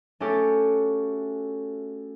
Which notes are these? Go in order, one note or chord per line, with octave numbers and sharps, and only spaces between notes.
A3 C#4 F#4 G4 A4